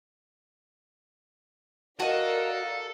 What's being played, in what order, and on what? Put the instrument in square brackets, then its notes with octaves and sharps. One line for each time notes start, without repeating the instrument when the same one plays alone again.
[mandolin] F#4 D#5 [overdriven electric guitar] A4 [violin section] A#4 D5 [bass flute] F5